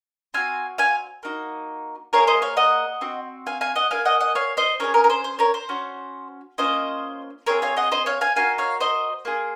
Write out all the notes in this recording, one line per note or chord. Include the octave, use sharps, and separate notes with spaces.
C4 F#4 F5 G#5
F5 G#5
A#3 D#4 F#4
A#3 F4 G#4 A#4 C#5
C5 D#5
C#5 F5
D#5 F#5
C4 F#4
F5 G#5
F5 G#5
D#5 F#5
A#3 F4 G#4 F5 G#5
D#5 F#5
D#5 F#5
C#5 F5
C5 D#5
C#4 F4 G#4 A#4 C#5
A#4
A#4
C5
C5
A#4 C#5
C5
C#4 F#4
A#3 C#4 F4 C5 D#5
C4 F4 G#4 A#4 C#5
C#5 F5
D#5 F#5
C5 D#5
C#5 F5
F5 G#5
A#3 D#4 F#4 F5 G#5
C#5 F5
C5 D#5
A#3 F4 G#4